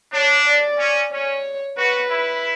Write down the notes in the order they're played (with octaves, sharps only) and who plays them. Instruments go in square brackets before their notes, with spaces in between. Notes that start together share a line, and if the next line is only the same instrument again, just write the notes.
[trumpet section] D4 [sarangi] C#5
[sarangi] D5
[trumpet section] C#4
[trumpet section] C#4 [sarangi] C#5
[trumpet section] F#4 [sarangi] B4
[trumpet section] E4